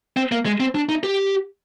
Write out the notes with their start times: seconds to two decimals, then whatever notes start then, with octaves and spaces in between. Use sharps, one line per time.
0.17 C4
0.32 A#3
0.46 G#3
0.60 C4
0.75 D4
0.89 D#4
1.03 G4